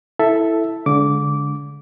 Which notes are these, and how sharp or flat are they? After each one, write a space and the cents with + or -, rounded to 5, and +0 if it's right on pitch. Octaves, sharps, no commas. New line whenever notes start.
E4 +0 A4 +0 E5 +0
D3 -30 G#3 +0 D6 -15